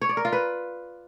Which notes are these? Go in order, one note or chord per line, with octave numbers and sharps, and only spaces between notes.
C#5
D5
A#4
F4
B4